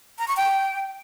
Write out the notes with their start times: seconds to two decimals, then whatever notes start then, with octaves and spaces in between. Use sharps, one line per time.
0.19 A#5
0.28 C#6
0.37 G5